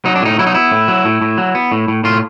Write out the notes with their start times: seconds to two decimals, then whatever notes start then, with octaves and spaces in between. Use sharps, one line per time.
0.05 F#3 D#4
0.15 D4
0.22 A2 D#4
0.39 F#3 E4
0.47 D#4
0.54 B3 E4
0.72 A2
0.88 F#3
1.05 A2
1.22 A2
1.38 F#3
1.55 B3
1.72 A2
1.88 A2
2.04 A2 F4